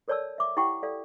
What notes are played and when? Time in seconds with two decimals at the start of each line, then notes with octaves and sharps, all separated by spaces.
0.08 A4 A#4 C#5 D5 A5 E6
0.38 E5 D6
0.57 E4 G4 F#5 G5 C#6
0.83 A4 D5 F5